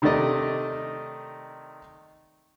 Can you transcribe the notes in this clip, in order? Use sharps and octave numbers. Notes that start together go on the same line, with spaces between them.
C3 D#3 A3 D#4 D5 D#5